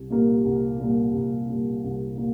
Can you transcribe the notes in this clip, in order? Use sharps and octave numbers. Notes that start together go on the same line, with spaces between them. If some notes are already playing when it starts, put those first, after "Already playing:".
Already playing: C2
A#2 G3 A#3
C2
A#2 G3 A#3
C2
A#2 G3 A#3
C2
A#2 G3 A#3